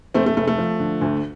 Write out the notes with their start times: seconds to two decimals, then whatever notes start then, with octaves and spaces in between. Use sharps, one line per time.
0.14 F1 A3 C4
0.26 A3
0.36 F1 A3
0.47 A3
0.58 F3
0.80 D3
1.01 D2